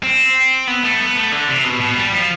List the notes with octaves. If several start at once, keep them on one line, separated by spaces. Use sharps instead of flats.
C4
B3
A3
B3
A3
D3
C3
B2
B2
G3
F3